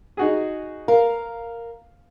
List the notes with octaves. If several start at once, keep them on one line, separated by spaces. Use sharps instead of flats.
D#4 F#4 G#4
A#4 F5